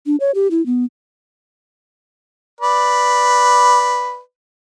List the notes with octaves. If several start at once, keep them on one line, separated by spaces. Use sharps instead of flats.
D4
C#5
G4
E4
B3
B4 D5